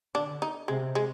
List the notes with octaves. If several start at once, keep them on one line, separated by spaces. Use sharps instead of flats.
D3 D4
D#4
C3 G#3
G#3